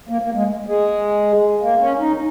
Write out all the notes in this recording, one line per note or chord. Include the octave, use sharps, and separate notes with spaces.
A#3
A#3
G#3
G#3
A#3
C#4
D#4